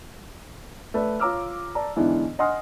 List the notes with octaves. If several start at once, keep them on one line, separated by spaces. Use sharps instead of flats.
A3 B4 D5
F4 C#5 A#5 D6 E6 F6
D5 A5 A#5
G#2 D3 E3 B3 D4 E4
D#5 F#5 G#5 C6 D#6 F6